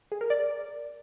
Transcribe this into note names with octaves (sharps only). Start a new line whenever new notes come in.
G#4
A#4
D5